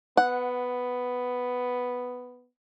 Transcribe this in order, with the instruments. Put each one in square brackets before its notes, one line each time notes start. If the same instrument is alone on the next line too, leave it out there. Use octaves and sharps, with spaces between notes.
[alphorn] B3 [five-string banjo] F#5